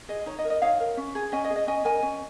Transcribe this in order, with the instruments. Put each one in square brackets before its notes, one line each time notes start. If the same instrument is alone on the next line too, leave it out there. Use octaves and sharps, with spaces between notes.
[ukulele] G#4 D#5
D#4 C#5
D#5
A#4
D#5
D#4 C#5 F5
A#4
C#4
G#4
C#4 D#5 G#5
D#5
G#4
D#5
C#4 D#5 G#5
A#4 D#5 G#5
C#4